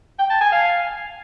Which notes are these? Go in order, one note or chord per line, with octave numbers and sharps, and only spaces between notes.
G5
A5
G#5
F5